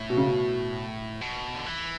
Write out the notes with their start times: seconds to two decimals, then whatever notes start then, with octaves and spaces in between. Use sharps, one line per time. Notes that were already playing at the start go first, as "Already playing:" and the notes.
Already playing: A2
0.10 B2
0.17 C#3
0.26 B2
1.21 B2
1.54 D3
1.66 E3